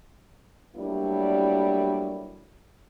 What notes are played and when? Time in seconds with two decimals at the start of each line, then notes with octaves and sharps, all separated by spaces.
0.75 F#3 G3 A3 A#3 D4 E4